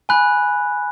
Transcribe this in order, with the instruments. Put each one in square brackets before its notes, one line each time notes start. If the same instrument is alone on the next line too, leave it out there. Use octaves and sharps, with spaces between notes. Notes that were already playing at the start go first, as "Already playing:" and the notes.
[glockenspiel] G#5 B5 F#6